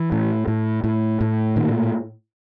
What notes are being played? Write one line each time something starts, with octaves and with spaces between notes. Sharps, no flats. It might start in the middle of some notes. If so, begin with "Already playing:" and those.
Already playing: E3
A2
A2
A2
A2
A#2 D#3